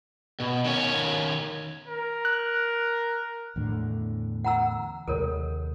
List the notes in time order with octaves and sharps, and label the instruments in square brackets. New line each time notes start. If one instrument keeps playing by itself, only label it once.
[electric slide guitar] B2
D#3 C#4 C#5
[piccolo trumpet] A#4
[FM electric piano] F#6
[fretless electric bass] E2 A2 D3
[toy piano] F#5 A#5 E6
[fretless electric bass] D#2 C3 G#3 [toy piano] A4 A#4 C#5